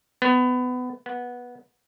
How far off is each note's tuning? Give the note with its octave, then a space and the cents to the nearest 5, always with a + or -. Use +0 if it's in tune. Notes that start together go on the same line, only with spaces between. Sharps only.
B3 +20
B3 -15